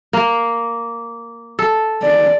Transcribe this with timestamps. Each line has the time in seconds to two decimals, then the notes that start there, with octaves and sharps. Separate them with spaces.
0.13 A#3
1.59 A4
2.02 D5